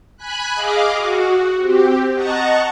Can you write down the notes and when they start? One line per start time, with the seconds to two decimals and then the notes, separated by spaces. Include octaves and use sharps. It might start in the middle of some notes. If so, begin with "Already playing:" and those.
0.17 G#5 B5 F#6
0.53 G#4 D#5 F5 D6
0.95 F#4
1.57 C4 G4
2.13 D#5 F#5 A5 A#5 C#6